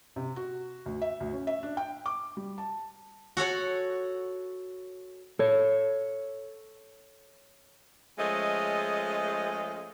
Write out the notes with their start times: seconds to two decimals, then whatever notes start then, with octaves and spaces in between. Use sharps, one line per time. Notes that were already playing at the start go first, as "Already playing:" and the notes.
0.16 C3
0.36 F#4
0.86 D2
1.02 E5
1.20 D2
1.33 C#4
1.47 E5
1.63 D4
1.77 G5
2.06 D6
2.37 G3
2.58 A5
3.37 F#4 A4 C#5 F#5
5.39 A4 C#5
8.18 F3 G#3 A3 C#4 G#4 D#5